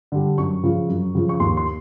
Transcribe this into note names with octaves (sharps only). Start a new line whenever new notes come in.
D3 G3
F#2 C#6
C#3 F3
F#2
C#3 F3
C#6
D#2 C6
C6